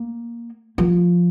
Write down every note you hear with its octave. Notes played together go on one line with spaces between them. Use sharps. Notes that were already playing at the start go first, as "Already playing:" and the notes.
Already playing: A#3
F3